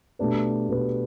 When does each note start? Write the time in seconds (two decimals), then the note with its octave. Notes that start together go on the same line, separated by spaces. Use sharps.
0.19 B2 A3 D4 G4 B4
0.69 B2 A3 D4 G4 B4